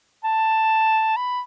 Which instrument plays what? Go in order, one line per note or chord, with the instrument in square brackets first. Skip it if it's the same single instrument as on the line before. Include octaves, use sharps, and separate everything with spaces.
[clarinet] A5
B5